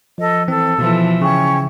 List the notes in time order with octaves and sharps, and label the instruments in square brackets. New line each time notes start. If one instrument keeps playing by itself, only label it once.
[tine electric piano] F3 [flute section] A4 D#5
[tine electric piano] E3 C4 [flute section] A4
[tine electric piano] B2 [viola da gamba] E3 F3
[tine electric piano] C#3 [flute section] C#4 G5 C#6